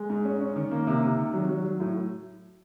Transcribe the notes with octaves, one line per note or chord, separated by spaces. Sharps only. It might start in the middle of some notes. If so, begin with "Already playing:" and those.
Already playing: G#3
G#2
C#4
C#4
D#3
A#3
C3
C3
D#3
F#3
F#3
F#3
A2